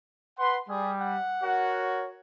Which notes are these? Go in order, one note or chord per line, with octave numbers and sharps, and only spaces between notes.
B4 F#5 C6
G3 G#4
F#5
F#4 A#4 C#5